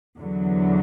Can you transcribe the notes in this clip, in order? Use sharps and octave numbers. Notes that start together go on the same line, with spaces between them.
E2 D3 F#3